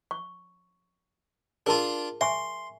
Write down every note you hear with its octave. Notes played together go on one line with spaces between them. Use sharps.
C#6
D4 F4 G#4 A#4 A5
E5 G#5 C6 C#6